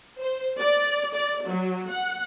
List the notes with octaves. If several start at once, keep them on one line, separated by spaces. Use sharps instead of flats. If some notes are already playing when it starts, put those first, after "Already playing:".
C5
D5
D5
F#3
F#5